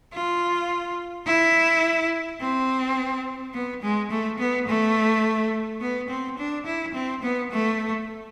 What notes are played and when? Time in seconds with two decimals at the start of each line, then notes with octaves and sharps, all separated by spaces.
0.13 F4
1.26 E4
2.41 C4
3.54 B3
3.82 G#3
4.11 A3
4.39 B3
4.67 A3
5.81 B3
6.09 C4
6.38 D4
6.66 E4
6.94 C4
7.23 B3
7.51 A3